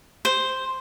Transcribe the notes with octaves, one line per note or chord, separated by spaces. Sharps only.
C5